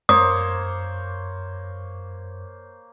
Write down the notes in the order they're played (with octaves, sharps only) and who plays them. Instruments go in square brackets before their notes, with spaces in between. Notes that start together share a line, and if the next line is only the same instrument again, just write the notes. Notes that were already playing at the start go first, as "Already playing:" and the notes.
[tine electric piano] F#2 [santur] A#3 C5 C#5 [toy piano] D#6